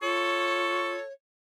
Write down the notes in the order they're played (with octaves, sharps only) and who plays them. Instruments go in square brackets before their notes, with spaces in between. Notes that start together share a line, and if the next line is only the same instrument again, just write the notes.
[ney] F4 [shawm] A4 [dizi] C#5 [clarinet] C#6